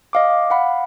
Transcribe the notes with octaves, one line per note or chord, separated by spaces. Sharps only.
D#5 F5 D6
F5 F#5 B5